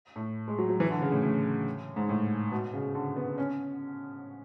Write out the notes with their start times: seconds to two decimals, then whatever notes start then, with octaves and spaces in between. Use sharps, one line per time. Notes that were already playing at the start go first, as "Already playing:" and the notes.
0.16 A2
0.48 G#3
0.59 F#3
0.69 F#3
0.80 E3
0.91 D3
1.02 C#3
1.12 A2
1.22 A2
1.96 G#2
2.09 A2
2.51 B2
2.74 C#3
2.94 D3
3.16 B3
3.38 C#4